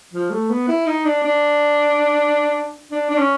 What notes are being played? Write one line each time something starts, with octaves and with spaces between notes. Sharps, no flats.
F3
A3
B3
E4
D#4
D4
D4
D4
D4
C#4